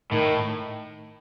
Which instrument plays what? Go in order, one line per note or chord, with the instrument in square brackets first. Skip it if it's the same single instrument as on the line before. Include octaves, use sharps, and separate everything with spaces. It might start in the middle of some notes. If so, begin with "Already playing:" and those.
[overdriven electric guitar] A2 [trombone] D#3